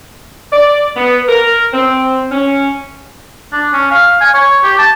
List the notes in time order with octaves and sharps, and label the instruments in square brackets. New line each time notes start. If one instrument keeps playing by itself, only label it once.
[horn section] D5
B3
A#4
C4
C#4
[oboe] D4
C#4
F5
G#5
C#5
G4
A5